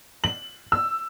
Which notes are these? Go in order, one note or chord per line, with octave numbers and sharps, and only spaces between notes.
F#7
E6